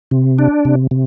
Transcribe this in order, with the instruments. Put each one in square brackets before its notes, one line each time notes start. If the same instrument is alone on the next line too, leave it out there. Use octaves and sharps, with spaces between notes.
[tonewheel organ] C3
D4
C3
C3